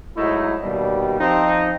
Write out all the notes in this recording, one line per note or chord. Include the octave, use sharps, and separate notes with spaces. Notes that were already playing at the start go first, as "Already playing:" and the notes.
G#2 F#3 A3 D#4 E4
D#2 B2 G3
F3 C4 D#4